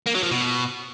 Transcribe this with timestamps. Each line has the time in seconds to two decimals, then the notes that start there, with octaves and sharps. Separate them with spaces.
0.06 A#3
0.15 F#3
0.23 F3
0.31 B2